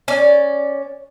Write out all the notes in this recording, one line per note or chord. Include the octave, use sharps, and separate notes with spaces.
C#4 D5